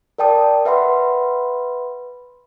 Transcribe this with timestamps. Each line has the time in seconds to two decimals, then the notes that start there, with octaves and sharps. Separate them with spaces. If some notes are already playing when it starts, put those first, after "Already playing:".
0.18 A#4 D5 G5 A5 D#6
0.65 B4 E5 F#5 B5 C6